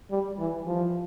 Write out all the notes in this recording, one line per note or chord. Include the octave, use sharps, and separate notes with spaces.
G3
E3
F3